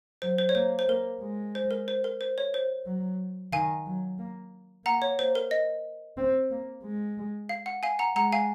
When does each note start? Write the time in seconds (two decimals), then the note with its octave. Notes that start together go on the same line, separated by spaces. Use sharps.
0.22 F#3 C5
0.38 C5
0.49 C#5
0.55 A#3 C5
0.79 C5
0.88 A#3 A#4
1.21 G#3
1.55 C5
1.71 A#4
1.88 C5
2.04 A#4
2.21 C5
2.38 C#5
2.54 C5
2.86 F#3
3.53 D#3 F5 G#5
3.86 F#3
4.19 A#3
4.85 A#3 F#5 A#5
5.02 C#5
5.19 C5
5.35 A#4
5.51 D#5
6.17 C4
6.51 A#3
6.84 G#3
7.49 F5
7.66 F#5
7.83 F5 G#5
7.99 F#5 A#5
8.16 G#3 F#5 A#5
8.32 F5 G#5